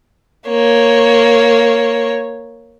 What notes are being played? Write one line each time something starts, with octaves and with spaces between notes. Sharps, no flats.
A#3 C#5